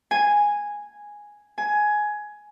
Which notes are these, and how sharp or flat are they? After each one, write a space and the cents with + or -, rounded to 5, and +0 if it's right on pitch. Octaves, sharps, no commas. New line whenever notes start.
G#5 -5
G#5 +15